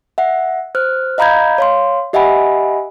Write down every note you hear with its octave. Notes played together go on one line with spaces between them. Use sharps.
E5 F#5
C5 F6 F#6
D#5 F5 A#5 B5 G6 G#6
C#5 F5 C6
G4 D#5 E5 F#5 G#5 B5